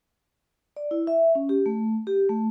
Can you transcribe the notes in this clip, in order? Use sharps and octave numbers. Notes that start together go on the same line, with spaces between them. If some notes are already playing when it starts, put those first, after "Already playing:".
D5
E4
E5
C#4
G4
A3
G4
A3